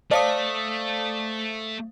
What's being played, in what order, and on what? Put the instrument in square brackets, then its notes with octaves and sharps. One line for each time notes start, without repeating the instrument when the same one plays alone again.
[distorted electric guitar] A3 [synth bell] C5 F5 D#6 [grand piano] D5 A5